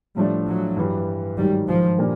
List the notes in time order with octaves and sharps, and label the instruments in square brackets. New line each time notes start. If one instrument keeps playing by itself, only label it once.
[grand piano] A2 F3 A3 D4 [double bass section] G3
[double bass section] F#3
[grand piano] G2 E3 G3
[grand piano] G#2 D#3 F#3 [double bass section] G3
[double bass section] F3
[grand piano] A#2 G3 A#3 D4